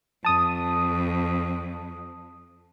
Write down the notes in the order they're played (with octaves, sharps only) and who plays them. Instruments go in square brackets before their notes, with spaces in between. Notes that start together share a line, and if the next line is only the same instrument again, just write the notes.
[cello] F2 [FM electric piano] A5 D#6